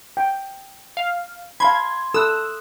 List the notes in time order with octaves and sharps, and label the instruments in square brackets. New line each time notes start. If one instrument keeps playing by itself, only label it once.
[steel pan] G5
[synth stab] F5
[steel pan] F5 A5 B5 [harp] C6 [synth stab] G#6
[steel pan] A4 [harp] D#6 F#6 [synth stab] E6